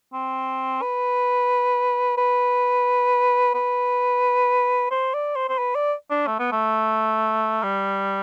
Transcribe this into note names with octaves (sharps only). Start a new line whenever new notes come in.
C4
B4
B4
B4
C5
D5
C5
C5
B4
D5
D4
A3
B3
A3
G3